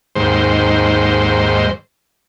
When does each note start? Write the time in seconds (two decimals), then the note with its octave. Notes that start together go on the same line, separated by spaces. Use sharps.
0.16 D#2 G#2 C5